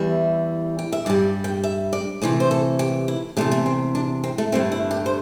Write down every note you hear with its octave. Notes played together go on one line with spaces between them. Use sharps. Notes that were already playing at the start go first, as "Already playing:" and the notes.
Already playing: E2 E3 G3 E5
G5
E5
G2 G3 D5
G5
E5
D5
C3 E3 A3 D5
C5
A4
G4
E4
E2 C3 A3 D4
A3
C4
D4
C4
A3
G2 D3 A3 C4
E4
G4
C5